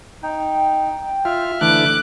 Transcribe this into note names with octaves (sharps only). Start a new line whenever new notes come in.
D#4 G5
F4 E5 F6
D3 E3 A3 D6 F#6